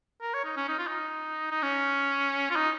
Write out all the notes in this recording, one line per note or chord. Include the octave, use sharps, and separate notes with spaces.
A#4
C#5
D#4
C#4
D#4
F4
D#4
D#4
C#4
F4
D#4